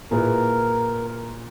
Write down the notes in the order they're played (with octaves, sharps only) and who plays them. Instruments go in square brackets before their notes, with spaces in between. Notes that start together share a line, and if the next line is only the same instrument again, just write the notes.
[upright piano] A#2 A#3 E4 G#4 B4 [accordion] A#4